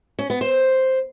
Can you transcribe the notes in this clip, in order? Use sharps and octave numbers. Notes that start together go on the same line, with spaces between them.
C#4
B3
C5